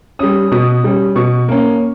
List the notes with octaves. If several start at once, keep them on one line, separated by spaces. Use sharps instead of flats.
G3 C#4 D#6
B2 D#6
G3 C#4
B2 C#6
A#3 C#4